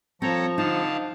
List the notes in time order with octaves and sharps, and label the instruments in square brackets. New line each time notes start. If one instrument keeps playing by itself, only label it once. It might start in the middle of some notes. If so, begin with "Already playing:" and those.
[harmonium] F3 [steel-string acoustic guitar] C4 [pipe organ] A4 C#5 A#5
[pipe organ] D3 F5 A5 [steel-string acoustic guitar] D#4